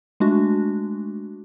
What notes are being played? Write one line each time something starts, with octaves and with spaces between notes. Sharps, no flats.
G#3 A3 D4 F#4